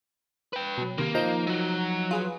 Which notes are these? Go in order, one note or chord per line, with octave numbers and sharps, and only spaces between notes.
B4 G5
B2 F#3
C3 D#3 A#3
F3 D#4 A#5 G6
F#3 F#4
F4 G#4 B4